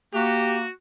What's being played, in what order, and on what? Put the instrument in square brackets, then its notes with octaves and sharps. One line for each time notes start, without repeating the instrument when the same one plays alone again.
[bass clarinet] A#3 [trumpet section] F#4 [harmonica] G4